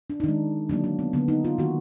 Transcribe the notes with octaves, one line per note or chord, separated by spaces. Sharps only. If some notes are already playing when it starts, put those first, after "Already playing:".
D4
D#4
D#3 G#3 D4
D3 F#3 A#3 D4
D4
B3
D3 F#3 A#3 B3
D#4
F4
D#3 A#3 F#4